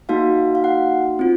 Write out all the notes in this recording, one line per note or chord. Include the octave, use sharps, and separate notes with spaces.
A#3 D#4 F#4 F5
F5
F#5
C4 F4